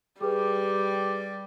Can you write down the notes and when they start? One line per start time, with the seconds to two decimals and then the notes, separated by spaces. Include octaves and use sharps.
0.21 G3 G4 G#4 B4